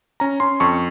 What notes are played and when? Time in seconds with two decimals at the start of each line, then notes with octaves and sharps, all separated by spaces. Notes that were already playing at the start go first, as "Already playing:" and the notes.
0.20 C#4 A#5
0.40 C#4 C6
0.60 F2 C#6